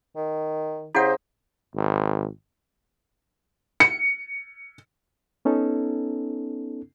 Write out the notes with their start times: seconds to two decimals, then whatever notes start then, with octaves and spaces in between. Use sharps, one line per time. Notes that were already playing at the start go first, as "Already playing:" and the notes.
0.16 D#3
0.95 C#3 E4 G4 C5 D#5 F#5
1.75 G#1
3.80 C#7
5.45 B3 C#4 D#4 A4